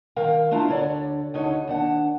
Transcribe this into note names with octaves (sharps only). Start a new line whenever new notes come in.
G2 D#3 A#4 F5 G5
A3 D4 E4 F4 A#5
D2 D3 C#5 D5
D2 D3 D#4 C#5
D#2 D4 F#5